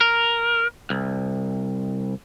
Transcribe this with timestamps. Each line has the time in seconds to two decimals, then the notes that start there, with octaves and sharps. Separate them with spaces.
0.01 A#4
0.90 C2